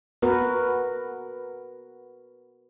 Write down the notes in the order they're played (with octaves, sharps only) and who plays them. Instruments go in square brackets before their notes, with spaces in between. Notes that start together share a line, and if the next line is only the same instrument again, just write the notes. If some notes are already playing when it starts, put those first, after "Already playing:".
[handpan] B3 F#4 A#4 B4